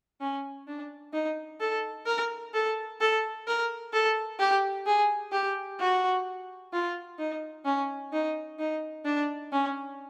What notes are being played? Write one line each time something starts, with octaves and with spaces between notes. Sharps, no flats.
C#4
D4
D#4
A4
A#4
A4
A4
A#4
A4
G4
G#4
G4
F#4
F4
D#4
C#4
D#4
D#4
D4
C#4